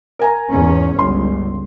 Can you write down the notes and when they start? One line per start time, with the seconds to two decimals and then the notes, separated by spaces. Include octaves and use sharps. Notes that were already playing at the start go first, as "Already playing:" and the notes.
0.19 A#4 G#5 A#5
0.50 E2 G#2 C#4
0.99 G1 C#2 C6